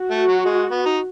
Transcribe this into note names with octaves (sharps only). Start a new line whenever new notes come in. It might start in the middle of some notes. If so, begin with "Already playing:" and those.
Already playing: F#4
A3
F#3
G#3
B3
D#4